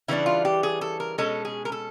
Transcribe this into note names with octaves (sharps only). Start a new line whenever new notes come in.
C#3 E3 G3 B3 D4 E4
F4
G4
G#4
A4
A#4
B2 G#3 C#4 A4
G#4
A#4
A4